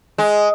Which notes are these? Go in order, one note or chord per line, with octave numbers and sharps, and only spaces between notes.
G#3